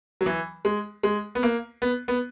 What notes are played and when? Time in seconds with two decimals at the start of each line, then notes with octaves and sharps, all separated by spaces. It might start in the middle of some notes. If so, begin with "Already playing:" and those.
0.21 F#3
0.26 E3
0.65 G#3
1.03 G#3
1.35 B3
1.43 A#3
1.82 B3
2.08 B3